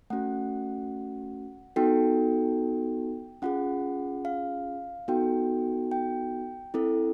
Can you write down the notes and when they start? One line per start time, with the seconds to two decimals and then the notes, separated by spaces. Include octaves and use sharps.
0.10 A3 C#4 F#4 F#5
1.76 B3 D#4 F#4 A4 G5
3.42 C#4 F4 G#4 F#5
4.25 F5
5.08 B3 D#4 F#4 A4 G5
5.91 G5
6.74 C4 E4 A4